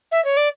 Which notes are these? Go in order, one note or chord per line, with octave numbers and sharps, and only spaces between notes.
E5
C#5
D5